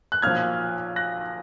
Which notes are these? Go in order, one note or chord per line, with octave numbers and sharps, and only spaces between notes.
F#6
B1 A#2 F3 F6 G#6
F#6 A#6